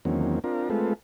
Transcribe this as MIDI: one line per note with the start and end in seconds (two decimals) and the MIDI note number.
0.05 0.39 40
0.05 0.39 51
0.05 0.39 54
0.05 0.39 58
0.05 0.39 60
0.05 0.39 61
0.44 0.69 60
0.44 0.69 62
0.44 0.69 65
0.44 0.69 70
0.70 0.93 56
0.70 0.93 57
0.70 0.93 60
0.70 0.93 65
0.70 0.93 69
0.70 0.93 71